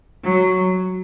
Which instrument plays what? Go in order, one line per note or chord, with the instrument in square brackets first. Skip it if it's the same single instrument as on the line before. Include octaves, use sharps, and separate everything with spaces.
[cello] F#3